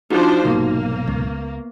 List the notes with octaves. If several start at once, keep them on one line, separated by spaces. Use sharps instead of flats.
F3 D4 D#4 F#4 C5
B1 G#2 C3 A#3
C#2 B3